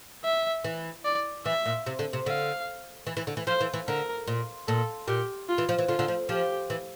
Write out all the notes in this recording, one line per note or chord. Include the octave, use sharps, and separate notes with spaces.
E5
E3
D5
E3 E5
A#2
C3
D3
C3
D3 F5
E3
E3
D3
E3
F3 C5
E3
E3
D3 A#4
A#2
A#2 A4
A#2 G4
F4
E3
F3
E3
D3 F4
D3
F3
F3 G4
E3